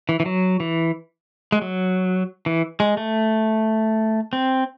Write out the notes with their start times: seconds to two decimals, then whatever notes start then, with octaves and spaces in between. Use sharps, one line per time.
0.09 E3
0.20 E3
0.26 F#3
0.60 E3
1.52 G#3
1.62 F#3
2.46 E3
2.80 G#3
2.97 A3
4.33 C4